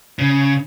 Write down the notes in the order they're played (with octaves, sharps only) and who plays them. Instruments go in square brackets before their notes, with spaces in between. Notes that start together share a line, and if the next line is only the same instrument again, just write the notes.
[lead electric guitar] C#3